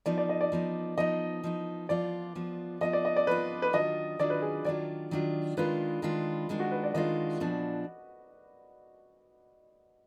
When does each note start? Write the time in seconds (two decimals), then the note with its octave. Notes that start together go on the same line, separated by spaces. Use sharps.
0.06 F3 B3 D#4 D5
0.18 D5
0.29 D#5
0.41 D5
0.52 F3 B3 D#4
0.98 F3 B3 D#4 D#5
1.44 F3 B3 D#4
1.89 F3 B3 F4 D5
2.35 F3 B3 F4
2.81 F3 B3 F4 D#5
2.93 D5
3.05 D#5
3.16 D5
3.27 F3 B3 F4 B4
3.62 B4
3.73 D#3 F#3 D4 F4 D#5
4.19 D#3 F#3 D4 F4 D5
4.30 B4
4.42 G#4
4.65 D#3 F#3 D4 F4 D5
5.11 D#3 F#3 D4 F4
5.57 D#3 G#3 D4 F4 B4
6.02 D#3 G#3 D4 F4
6.49 D#3 G#3 D4 F4
6.60 F#4
6.71 B4
6.83 D5
6.94 D#3 G#3 D4 F4 D#5
7.40 A#2 F3 B3 D4